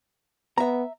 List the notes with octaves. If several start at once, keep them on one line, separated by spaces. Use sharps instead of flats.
B3 E5 A#5